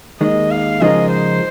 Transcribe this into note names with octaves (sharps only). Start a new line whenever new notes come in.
D#2 D#3 G#3 D#5
F5
C#3 F3 G#3 D#4 A#4 D#5
C5